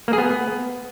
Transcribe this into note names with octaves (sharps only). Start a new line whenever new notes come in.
A#3
G#4
B3